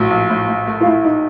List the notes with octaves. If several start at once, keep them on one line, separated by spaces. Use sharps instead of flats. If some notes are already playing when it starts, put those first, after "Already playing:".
Already playing: A#1 A2 F#3
A#1
A2
A2
A3
F4
A3 E4
D#4